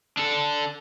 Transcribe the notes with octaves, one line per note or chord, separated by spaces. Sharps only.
D4 A4